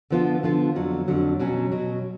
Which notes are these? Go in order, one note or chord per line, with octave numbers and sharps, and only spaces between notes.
D3 F3 B3 F4
D3 F3 B3 F4
F2 D3 F#3
F2 D3 F#3
B2 F#3 C#4
B2 F#3 C#4